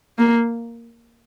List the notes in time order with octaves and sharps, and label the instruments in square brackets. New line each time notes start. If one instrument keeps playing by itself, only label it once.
[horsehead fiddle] A#3